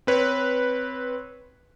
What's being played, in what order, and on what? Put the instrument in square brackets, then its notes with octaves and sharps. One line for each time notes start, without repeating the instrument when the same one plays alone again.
[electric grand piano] C4 B4 C#5